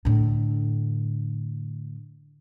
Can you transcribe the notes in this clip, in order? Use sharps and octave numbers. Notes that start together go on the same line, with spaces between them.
A2 D3